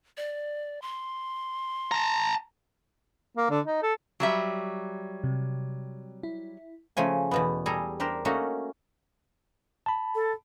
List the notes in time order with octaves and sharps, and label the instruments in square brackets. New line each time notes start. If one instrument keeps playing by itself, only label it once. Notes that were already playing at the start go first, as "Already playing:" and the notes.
[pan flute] D5
C6
[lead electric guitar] A5 A#5
[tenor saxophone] A#3
D3
D#4
A4
[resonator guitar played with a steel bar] F#3 G3 E5
[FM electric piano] C3
E4
[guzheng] C#3 F3 A3 G#5
E2 B2 B3
G3 G#4 A4 G#5 A#5
D4 G4 A#4 C5
A3 A#3 C#4 D#4 F#4
[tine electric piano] A5 B5
[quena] A4